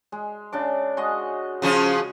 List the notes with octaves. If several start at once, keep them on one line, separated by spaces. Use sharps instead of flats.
G#3
C#3 D4 D6
G#3 F#4 D#5
C#3 F3 C#4